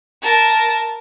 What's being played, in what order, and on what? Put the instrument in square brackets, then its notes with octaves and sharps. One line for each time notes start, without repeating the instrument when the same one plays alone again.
[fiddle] A#4 A5